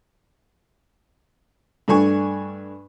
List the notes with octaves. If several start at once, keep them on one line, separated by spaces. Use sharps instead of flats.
G2 A3 D4 G#5 C#6